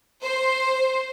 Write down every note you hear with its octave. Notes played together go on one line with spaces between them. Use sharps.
C5